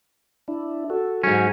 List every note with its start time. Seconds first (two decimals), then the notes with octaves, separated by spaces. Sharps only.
0.48 D4 E4
0.90 F#4 A4
1.24 G#2 F#3 C#4 F#4